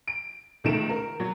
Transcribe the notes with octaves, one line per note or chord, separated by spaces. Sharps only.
D7
C#2 D#3 A3 D7 E7
A#4
F#3